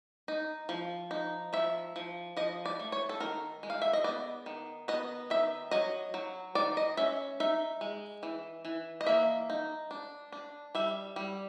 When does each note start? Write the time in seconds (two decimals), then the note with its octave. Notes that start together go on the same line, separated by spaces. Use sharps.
0.28 D#4
0.69 F3
1.11 D#4
1.53 F3 E5
1.96 F3
2.37 F3 D#5
2.66 D5
2.79 A3
2.92 C#5
3.09 A4
3.20 D#3 A#4
3.63 G#3
3.70 F5
3.82 E5
3.93 D#5
4.04 B3 D5
4.46 D#3
4.88 B3 D#5
5.30 D#3 E5
5.71 F#3 D#5
6.14 F#3
6.55 D#3 D5
6.77 D#5
6.97 C#4 E5
7.40 D#4 E5
7.81 G#3
8.23 E3
8.65 E3
9.01 D#5
9.06 A#3 E5
9.50 D#4
9.91 D4
10.32 D4
10.75 G3 E5
11.16 G3